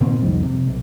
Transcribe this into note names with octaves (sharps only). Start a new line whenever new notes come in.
A#2 D#3 A#3 C4
C2 F2 D#3 G3
C3
B1